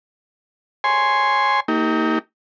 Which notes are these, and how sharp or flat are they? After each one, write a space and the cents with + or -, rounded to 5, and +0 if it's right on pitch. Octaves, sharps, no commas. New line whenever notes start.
C#5 +0 G#5 +0 C6 +0
A#3 -25 D#4 +30 G4 +0